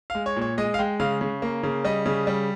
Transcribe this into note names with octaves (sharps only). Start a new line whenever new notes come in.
G#3 F5
C#5
A#2
C#5
G#3 D#5
F5
G#3 G5
C#3 F5
C#3
A#3
C#3
G3 D#5
C#3
G3